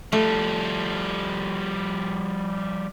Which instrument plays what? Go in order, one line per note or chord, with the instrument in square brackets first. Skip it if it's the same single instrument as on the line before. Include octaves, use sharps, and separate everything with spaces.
[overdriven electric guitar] F3 G3 [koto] A3